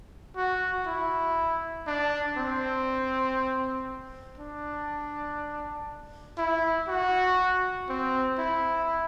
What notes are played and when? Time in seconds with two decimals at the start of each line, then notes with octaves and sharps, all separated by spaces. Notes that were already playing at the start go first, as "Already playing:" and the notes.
0.36 F#4
0.86 E4
1.87 D4
2.37 C4
4.38 D4
6.38 E4
6.88 F#4
7.89 C4
8.39 E4